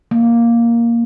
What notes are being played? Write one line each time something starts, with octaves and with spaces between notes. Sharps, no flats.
A#3